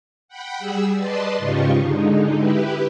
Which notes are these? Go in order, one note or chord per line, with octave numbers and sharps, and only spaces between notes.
F#5 G5 B5
G3 G#4 E6
B4 D5 D#5 A5 C6
G#2 C#3 F4 G4 D#5 C#6
D3 G#3 D#4
E4 G4 B4